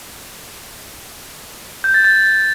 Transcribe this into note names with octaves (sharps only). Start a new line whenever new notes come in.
G6
A6
A6